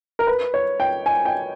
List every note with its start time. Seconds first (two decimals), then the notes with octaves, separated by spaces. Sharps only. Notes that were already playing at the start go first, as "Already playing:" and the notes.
0.19 A#4
0.27 B4
0.54 C#5
0.80 G5
1.06 G#5
1.25 G5